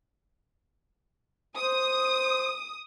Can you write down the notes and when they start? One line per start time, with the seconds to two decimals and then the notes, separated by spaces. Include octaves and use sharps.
1.57 C5 D#6